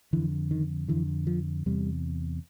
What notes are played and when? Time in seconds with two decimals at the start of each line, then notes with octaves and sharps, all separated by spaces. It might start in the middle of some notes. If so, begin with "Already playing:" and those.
0.13 F2 D3 E3
0.51 D#3
0.88 F2 D3 E3
1.27 F3
1.66 E2 C3 G3